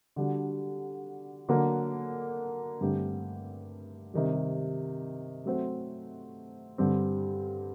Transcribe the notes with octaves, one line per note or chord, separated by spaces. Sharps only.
D3 G3 D4 F#4
D3 F#3 A#3
G2 D3 A3 C4 G4
C3 D#3 G3
F#3 A3 C4 F#4 C5
G2 D3 G3 C4